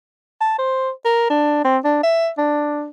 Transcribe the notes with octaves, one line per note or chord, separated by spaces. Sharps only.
A5
C5
A#4
D4
C4
D4
E5
D4